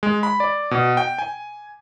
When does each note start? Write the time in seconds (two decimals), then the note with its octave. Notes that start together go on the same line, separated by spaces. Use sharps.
0.03 G#3
0.23 B5
0.40 D5
0.71 B2
0.97 G5
1.18 G#5